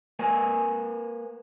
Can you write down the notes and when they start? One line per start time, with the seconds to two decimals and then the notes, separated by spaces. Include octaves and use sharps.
0.19 A#3 B4 G#5